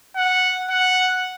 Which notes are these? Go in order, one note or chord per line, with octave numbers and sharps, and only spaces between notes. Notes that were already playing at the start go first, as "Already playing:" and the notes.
F#5
F#5